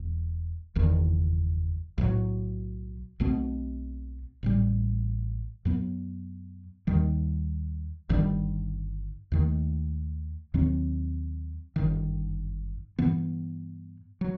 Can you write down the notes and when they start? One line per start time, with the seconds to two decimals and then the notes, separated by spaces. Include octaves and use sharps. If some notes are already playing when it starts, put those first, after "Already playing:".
Already playing: E1 E2 B2
0.75 F#1 E2 D#3
1.98 B1 A2 F#3
3.20 B1 B2 A3 C4
4.43 A1 A2 G3
5.65 F#2 F#3 B3
6.87 D#2 D#3 G3
8.09 G1 G2 D#3 G3
9.32 D#2 D#3 A3
10.54 D#2 D#3 F#3 C4
11.76 G1 F#2 D#3
12.99 G2 E3 B3
14.21 F#3